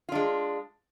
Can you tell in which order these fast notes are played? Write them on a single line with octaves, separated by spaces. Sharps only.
F4 D4 G#3